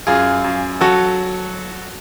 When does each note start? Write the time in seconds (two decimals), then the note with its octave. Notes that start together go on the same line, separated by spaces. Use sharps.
0.07 F#2 F4 G#4
0.44 F#2
0.81 F#3 F#4 A4